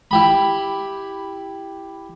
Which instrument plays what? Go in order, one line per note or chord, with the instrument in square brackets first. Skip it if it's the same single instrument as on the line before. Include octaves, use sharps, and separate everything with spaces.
[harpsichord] E4 G4 B5